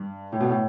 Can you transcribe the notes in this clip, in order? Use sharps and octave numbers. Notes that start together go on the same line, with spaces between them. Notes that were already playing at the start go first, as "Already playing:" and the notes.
Already playing: G2
A2
B2
A2